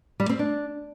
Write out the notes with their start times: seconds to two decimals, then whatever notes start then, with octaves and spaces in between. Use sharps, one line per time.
0.20 G3
0.29 C4
0.39 D4